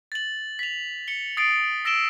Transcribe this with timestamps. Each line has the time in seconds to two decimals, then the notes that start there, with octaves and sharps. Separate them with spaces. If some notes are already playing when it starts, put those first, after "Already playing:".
0.12 A6 F#7
0.59 B6 F7
1.08 C#7 G7
1.37 D#6 A6 C7 D7
1.85 E6 A#6 D7 E7 G7